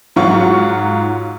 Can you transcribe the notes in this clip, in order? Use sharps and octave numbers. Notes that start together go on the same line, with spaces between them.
G#2 F#3 F4 F#5 C#6